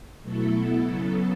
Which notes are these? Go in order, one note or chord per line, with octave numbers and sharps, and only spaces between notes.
B2 F#3 A3 E4 A4
B2 B3 E4 A4
C#3 F#3 B3 A4